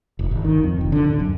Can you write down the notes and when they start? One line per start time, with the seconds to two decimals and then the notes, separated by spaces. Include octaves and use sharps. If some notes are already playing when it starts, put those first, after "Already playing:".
0.19 F1
0.31 G#1
0.44 D#3
0.63 F2
0.81 F1
0.92 D3
1.04 D1
1.20 F#2